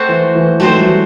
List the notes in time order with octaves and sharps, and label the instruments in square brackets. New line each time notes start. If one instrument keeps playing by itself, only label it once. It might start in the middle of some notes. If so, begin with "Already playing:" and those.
Already playing: [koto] A3 C4 F#4 C5
[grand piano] E3
E3
[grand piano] D#3 F#3 [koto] A3 C4 F#4 C5
[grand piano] E3 G3